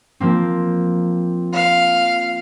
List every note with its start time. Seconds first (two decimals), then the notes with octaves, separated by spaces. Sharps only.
0.20 F3 A#3 C4
1.55 F5